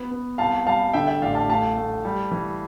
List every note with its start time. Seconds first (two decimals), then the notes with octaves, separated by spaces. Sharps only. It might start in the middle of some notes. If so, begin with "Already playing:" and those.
Already playing: B3
0.11 B3
0.38 C2 F5 A5
0.66 G3 F5 A5
0.93 D3 E5 G5
1.07 E5 G5
1.21 A1 D5 F5
1.35 F5 A5
1.49 A3 F5 A5
1.77 A3
2.05 G3
2.31 E3